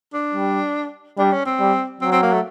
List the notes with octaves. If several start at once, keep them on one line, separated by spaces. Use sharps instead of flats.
D4
G3
G3 D4
C#4
C4
G3
F#3 C4
C4
A#3
A3